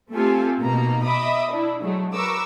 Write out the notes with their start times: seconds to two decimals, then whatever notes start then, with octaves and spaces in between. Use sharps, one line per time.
0.12 A3 C4 F4 G4 A4 G#5
0.60 B2 A#3 D#4 A#5
1.05 D#5 E5 B5 D6 D#6
1.50 D4 E4
1.82 F#3 G#3 A3
2.15 A#4 B4 C#6 D6 E6